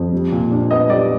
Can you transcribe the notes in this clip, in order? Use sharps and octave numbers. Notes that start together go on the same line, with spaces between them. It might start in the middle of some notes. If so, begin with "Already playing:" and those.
Already playing: F2
G3
A#2
D4
B3 D#5
G3 D5